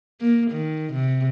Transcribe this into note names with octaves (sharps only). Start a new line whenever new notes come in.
A#3
D#3
C3